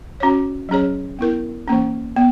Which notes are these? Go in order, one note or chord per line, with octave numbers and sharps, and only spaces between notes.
C#4 F#4 C#5
F#3 C#4 G#4 C#5
B3 E4 A#4
E3 A#3 C#4
B3